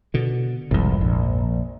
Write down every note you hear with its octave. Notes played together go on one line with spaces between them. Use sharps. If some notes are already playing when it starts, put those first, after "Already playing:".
B2 D3
F1 C2 F2 G#2
A#1